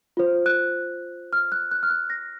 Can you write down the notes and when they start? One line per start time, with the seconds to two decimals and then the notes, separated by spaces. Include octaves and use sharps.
0.17 F4 C5
0.46 F#6
1.33 F6
1.52 F#6
1.71 F#6
1.83 F6
1.90 F#6
2.10 A#6